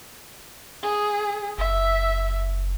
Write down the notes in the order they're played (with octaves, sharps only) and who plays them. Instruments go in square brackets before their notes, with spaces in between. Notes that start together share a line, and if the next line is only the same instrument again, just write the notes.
[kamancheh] G#4
[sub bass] F#1 [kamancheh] E5